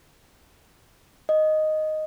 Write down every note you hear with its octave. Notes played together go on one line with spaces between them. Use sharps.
D#5